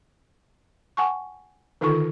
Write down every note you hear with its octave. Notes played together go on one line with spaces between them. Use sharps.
F#5 G#5 A5 C#6
D3 D#3 D#4 F4 A4 C#6